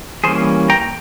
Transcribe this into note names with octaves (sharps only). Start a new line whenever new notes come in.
E3 G3 A#3 C#4 G#4 C5
G5 A#5